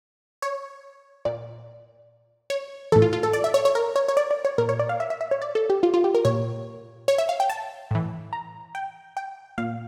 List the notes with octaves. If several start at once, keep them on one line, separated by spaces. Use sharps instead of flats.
C#5
A#2 D5
C#5
A2 E3 A4
F4
F4
A4
D5
E5
C#5
C#5
A#4
C#5
C#5
D5
D5
C#5
A#2 A#4
C#5
D5
F5
E5
E5
E5
C#5
D5
A4
G4
F4
F4
G4
A#4
A#2 C#5
C#5
E5
F5
G5
A5
A2 E3
A#5
G5
G5
A#2 F5